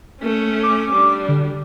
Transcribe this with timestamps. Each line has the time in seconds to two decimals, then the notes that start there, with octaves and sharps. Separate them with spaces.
0.22 A3 C#4
0.63 D6
0.93 G3 D4
1.29 D3